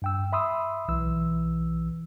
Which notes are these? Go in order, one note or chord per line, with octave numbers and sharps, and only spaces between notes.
G2 G5 E6
E5 B5 C6 D#6 E6
B1 E3 E6